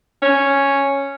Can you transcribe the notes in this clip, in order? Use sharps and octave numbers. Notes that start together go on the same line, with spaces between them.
C#4